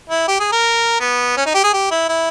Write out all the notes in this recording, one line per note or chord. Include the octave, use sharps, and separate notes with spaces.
E4
G4
G#4
A#4
B3
C#4
D#4
G4
G#4
G4
E4
E4